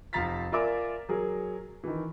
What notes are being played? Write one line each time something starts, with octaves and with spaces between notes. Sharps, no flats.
F1 F3 F5 A#5 A6 B6
F4 A#4 D5 E5 G#5 D6
F#3 G#4 A#4
D#3 E3